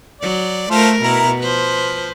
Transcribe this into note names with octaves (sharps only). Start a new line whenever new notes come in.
F#3 D5
A3 F4 A#4 C5 A5
B2 E4 A#4 A#5
F3 B4 C5